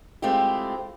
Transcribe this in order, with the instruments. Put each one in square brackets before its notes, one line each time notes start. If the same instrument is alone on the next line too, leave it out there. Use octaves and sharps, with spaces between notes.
[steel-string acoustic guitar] G#3 A3 C4 E4 F4 G4